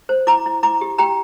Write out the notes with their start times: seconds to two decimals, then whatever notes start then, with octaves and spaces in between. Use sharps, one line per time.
0.09 C5
0.27 E4 A#5 D6
0.46 E4
0.63 E4 A#5 D6
0.81 G4
0.98 G4 G5 A#5